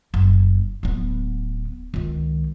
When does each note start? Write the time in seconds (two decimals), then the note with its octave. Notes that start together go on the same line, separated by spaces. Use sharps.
0.14 F#1
0.83 D1 B3
1.94 C#2 D#3